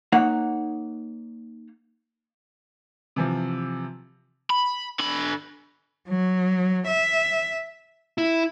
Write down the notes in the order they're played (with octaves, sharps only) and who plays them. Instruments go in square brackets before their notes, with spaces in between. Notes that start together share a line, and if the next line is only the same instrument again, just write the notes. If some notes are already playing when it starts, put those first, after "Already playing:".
[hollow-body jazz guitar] A#3 D#4 C#5 F#5
[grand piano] C3 E3 F3
[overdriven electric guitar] B5
D3 B5
[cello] F#3
E5
[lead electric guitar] E4